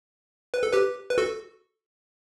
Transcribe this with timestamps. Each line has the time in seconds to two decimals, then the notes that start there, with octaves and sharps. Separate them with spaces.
0.54 B4
0.63 A4
0.73 G4 B4
1.10 B4
1.18 F#4 A4